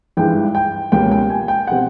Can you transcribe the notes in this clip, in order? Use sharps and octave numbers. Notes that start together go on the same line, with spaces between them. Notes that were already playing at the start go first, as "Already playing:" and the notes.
G#1 G2 E3 G#3 G5
G5
C#2 B2 G3 A#3 C#4 G5
G5
G#5
G5
B2 G3 C4 F#5